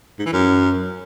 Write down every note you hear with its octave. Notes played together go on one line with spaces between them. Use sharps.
G#2
E3
F#2